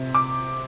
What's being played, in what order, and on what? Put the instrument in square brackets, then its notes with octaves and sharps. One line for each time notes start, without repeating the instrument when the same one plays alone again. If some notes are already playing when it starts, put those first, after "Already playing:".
Already playing: [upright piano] C3
D6